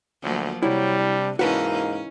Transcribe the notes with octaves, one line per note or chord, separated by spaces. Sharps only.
D2 F3 F#3 A#3
C3 F#3 G3 E4
D4
G#2 E3 A#3 C#4 D#4 F#4 B4 A5
C#4